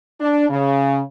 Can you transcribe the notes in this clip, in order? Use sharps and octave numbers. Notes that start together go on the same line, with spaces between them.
D4
C#3